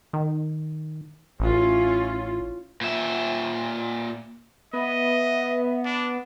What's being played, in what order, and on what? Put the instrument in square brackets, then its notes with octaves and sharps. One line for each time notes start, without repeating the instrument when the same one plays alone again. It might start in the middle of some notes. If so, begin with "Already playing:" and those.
[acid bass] D#3
[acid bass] A1 [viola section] C#4 E4 F4
[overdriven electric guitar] A#2 E5
[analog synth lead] B3 [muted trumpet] D#5 [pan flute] E5
[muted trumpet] D4